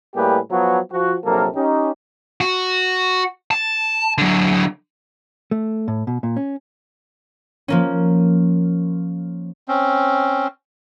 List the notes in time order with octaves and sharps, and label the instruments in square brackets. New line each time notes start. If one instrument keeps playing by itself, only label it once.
[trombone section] A2 G3 A#3 G4 G#4 B4
F3 F#3 B3
F3 F#4
A#1 C3 F#3 A#3 A4 A#4
C#4 D#4 G4
[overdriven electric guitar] F#4
A5
D3 F#3
[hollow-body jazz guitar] A3
A2
B2
A#2
C#4
[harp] F3 A#3 C#4
[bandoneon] C4 C#4